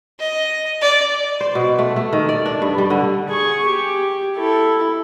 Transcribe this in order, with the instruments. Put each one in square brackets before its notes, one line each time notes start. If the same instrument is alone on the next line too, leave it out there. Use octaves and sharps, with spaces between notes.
[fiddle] D#5
D5
[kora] C5
B2
A3
A3
D#3
D5
D4
G2
G3
D3
[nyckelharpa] G#4 C#6
G4
E4 A4